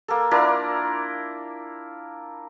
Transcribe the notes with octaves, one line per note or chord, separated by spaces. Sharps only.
A#3 A4
D4 E4 F4 A#4